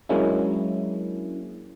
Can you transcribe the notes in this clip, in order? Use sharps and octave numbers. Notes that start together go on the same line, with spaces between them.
F#3 G#3 A#3 C#4 D4 E4